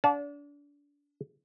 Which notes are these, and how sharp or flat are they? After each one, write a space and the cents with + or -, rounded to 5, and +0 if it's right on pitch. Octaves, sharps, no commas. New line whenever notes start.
D4 -30 F#5 -40 A5 -25